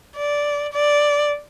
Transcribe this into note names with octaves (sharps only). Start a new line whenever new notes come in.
D5
D5